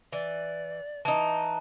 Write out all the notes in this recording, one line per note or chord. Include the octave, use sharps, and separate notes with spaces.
E3 D5
E3 D#4 A5